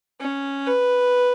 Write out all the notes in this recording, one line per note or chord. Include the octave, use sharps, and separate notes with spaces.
C#4
B4